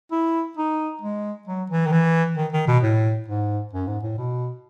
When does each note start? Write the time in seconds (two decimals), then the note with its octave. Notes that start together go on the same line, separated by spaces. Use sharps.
0.11 E4
0.57 D#4
1.02 G#3
1.47 F#3
1.70 E3
1.87 D#3
1.92 E3
2.37 D#3
2.53 D#3
2.68 B2
2.83 A2
3.28 G#2
3.73 F#2
3.87 G#2
4.03 A2
4.18 B2